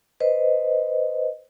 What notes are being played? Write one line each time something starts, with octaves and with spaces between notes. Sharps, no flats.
B4 C5 D#5